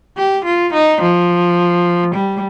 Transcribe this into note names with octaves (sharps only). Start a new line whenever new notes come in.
G4
F4
D#4
F3
G3